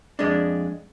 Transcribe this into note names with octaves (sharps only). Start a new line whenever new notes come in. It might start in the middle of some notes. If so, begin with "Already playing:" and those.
F2 G#3 D4